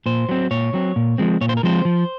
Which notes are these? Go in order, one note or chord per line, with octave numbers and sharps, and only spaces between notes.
A#2 C5
F#3 C4
A#2 C#5
F#3 C4
A#2
F3 G#3 C4
A#2 C#5
C5
A#4
F3 G#3 C4 C5
F3